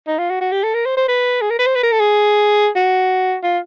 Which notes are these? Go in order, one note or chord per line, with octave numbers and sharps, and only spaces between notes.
D#4
F4
F#4
F#4
G4
A4
A#4
C5
C5
B4
G#4
A#4
B4
C5
B4
A#4
A4
G#4
F#4
F4